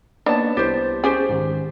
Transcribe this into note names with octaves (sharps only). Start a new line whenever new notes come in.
A#3 B3 D4 D#4 C#5 A5
C2 E4 G4 C5 A6
C#4 G4 G#4 C5
G#2 D#3